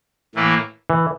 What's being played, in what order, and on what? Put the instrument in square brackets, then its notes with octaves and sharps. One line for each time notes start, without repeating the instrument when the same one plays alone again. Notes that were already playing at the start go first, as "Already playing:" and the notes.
[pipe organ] A2 E3 A#3 E4
[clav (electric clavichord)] E3